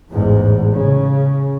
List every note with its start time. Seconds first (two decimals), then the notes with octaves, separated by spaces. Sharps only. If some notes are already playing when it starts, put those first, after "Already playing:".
0.11 A1 E2 G#2
0.73 C#3